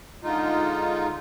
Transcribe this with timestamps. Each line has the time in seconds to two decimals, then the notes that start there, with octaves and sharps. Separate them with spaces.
0.23 D3 G#3 D#4 F4